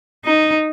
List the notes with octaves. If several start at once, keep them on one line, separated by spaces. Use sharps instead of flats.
D#4